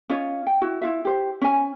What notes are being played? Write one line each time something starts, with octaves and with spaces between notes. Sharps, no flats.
C#4 F4 C#5 D#5
G5
E4 F#4
E4 F4 E5
G4 C5
C#4 G#5